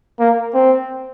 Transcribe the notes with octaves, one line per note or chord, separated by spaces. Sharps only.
A#3
C4